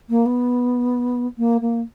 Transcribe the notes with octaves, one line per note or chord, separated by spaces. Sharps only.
A#3
B3
A#3
A#3